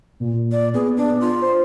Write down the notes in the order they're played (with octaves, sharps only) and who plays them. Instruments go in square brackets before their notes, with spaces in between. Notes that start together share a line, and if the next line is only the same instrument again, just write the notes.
[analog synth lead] A#2
[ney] D5
[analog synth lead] B3 [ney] G#4
[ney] D4
F4
[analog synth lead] C5